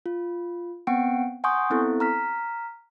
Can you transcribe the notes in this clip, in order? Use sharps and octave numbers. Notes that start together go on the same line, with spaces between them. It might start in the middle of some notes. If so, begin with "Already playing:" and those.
F4
B3 C4 F#5 G5 D7
F#5 G#5 C6 C#6 D#6 G6
B3 C4 E4 A4
A#5 F6 B6